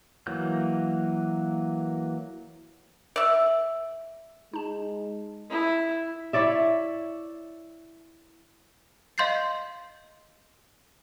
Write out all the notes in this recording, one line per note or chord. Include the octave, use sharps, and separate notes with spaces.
E3 F#3 A#3 G6
D5 E5
G#3 D#4 A5
E4
E4 C#5 D5 E5
D#5 F5 C6 G6 A6 C7